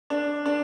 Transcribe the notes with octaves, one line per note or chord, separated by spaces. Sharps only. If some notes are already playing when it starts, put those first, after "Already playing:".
D4
D4